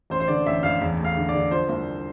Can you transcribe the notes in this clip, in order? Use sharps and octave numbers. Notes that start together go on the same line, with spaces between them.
A1 C5
C5
D3 D5
A1 E5
A1 F5
E2
A3
F5
D3
D5
D3
F3 C5
C2